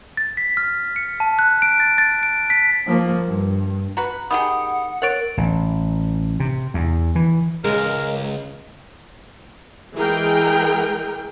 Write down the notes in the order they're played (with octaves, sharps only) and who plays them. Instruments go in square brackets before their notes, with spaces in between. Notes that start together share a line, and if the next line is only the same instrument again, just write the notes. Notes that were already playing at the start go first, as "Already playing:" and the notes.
[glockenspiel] A6
B6
F6
C#7
A5
F#6
D7
A6
A6
D7
B6
[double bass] F3 A#3
G2
[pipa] F#4 B4 [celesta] A#5
[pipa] D#3 G4 G#4 [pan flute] F#5 [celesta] B5 D#6
[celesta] A#4 A6 D7 [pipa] C#5 F#5
[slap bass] A1
C3
E2
E3
[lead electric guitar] C#2 [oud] G#3 [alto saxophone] A#4
[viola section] E3 G#3 G#4 A#4 G5